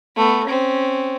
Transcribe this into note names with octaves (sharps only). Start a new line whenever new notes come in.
A3 B3
C4 C#4